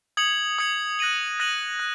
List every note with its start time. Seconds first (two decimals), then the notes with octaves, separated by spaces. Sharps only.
0.17 D#6 G#6 C#7 F#7
0.58 D#6 G#6 C#7 F#7
0.99 F#6 A#6 D#7 F#7
1.40 F#6 A#6 D#7 F#7
1.79 F#6